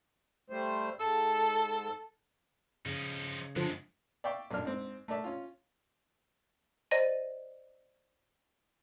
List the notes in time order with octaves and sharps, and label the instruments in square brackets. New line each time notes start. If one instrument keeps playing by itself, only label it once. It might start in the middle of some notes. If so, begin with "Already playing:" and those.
[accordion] G3 A3 C5
[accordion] G#2 E6 [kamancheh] A4
[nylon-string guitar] C#3 [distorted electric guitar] F3 D#4
[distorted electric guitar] F#2 G#3 [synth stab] D3 F3
[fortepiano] D5 E5 F5 G5 C#6
A1 F#2 A#3 D4 F6
G#2 C4
A3 A#4 D5 E5
C#4 F4
[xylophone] C5 D5 D#5 A#6 D#7